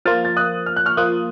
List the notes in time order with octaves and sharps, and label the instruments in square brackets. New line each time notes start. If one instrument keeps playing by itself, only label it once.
[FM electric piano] F3 A#3 F4 [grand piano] F6 A6
[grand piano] A6
D#6 F#6
F6
F#6
C#6 F6
[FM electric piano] F3 A#3 F4 [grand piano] D#6 F#6